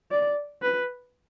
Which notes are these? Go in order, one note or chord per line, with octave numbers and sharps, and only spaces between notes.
D5
B4